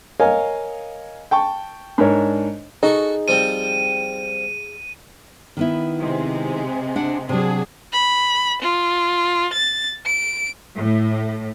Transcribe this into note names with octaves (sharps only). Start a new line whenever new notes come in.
A#4 C#5 D#5 F5 G#5
G5 A5 C#6
G#2 D4 A#4 C#5
D#4 F#4 G#4 A4 C#6
F3 G3 C4 D#7
D#3 B3 E4
C3 G#3 C4
D4 F#5
C3 F#3 D4 F#4 G#4
B5
F4
A6
D7
A2